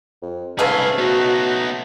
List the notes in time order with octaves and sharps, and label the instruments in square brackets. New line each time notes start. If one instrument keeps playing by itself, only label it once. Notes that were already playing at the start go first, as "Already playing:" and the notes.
[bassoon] F2
[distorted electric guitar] C2 G#4 [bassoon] G#2 [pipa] C#3 A3 B4 [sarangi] F5
[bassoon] B2 [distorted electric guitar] B3 D#4 [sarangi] F#4